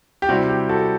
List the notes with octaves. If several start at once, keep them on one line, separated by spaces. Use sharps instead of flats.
G4
C3 G3 C4 E4 F#4
G4
F#4 A4